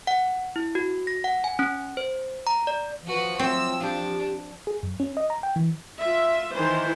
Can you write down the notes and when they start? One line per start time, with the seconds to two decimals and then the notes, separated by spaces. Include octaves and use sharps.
0.07 F#5
0.56 E4
0.75 F#4
1.07 A#6
1.24 F#5
1.44 G#5
1.59 C#4
1.97 C5
2.47 A#5
2.67 D5
3.07 F3 F#4 B4
3.39 F#3 C4 E4 C5 E6
3.80 D4 G4 F5
4.67 G#4
4.83 F#2
5.00 C#4
5.17 D#5
5.30 A#5
5.43 G5
5.56 E3
6.00 F4 E5
6.54 D#3 E3 C5